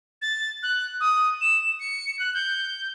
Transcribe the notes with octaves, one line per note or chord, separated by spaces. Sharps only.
A6
F#6
D#6
E7
C#7
F#6
G6